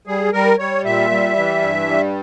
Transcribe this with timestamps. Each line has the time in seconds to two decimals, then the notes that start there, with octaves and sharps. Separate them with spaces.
0.07 G3 G#4
0.33 G3 A#4
0.59 G3 C#5
0.84 A#2 E5
1.10 G3
1.36 E3
1.62 G2
1.87 G3